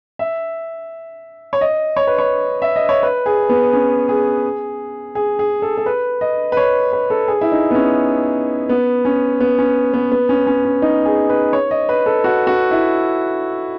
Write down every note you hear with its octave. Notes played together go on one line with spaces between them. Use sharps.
E5
C#5
D#5
C#5
B4
C#5
E5
D#5
C#5
B4
G#4
B3
C#4
G#4
G#4
G#4
A4
A4
B4
D#5
B4
C#5
B4
A4
G#4
E4
D#4
B3
C#4
B3
C#4
B3
C#4
B3
B3
C#4
C#4
C#4
D#4
G#4
B4
C#5
D#5
B4
A4
F#4
F#4
E4